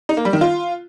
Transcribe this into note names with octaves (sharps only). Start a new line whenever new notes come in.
D#4
A#3
G3
D#3
F4